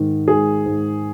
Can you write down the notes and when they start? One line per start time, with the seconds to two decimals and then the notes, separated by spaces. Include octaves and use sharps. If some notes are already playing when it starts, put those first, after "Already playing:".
Already playing: G#2 D#3
0.27 G#2 G#4
0.66 G#2